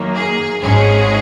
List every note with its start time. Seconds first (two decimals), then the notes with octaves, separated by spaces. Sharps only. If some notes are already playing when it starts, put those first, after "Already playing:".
Already playing: F#2 D#3 A#3
0.15 G#4
0.62 G#1 G#2 G#3 C#4 G#4